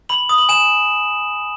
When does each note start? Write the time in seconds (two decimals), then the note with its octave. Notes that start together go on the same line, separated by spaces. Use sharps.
0.09 B5 F#7
0.29 D#6
0.38 F#7
0.49 G#5 E7